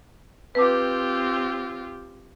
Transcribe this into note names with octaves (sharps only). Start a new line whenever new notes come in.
C4 F4 G4 B4 A5 D6